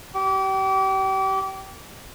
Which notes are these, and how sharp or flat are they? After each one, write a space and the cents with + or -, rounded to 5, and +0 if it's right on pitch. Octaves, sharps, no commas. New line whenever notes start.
G4 -35